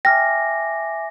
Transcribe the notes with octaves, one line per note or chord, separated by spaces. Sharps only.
E5 G5 G#5 D6 F6 A#6